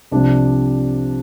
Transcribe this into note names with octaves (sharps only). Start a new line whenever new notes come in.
C2 C3 F3 D4